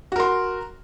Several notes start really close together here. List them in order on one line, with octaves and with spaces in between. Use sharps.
F#4 A#4 C6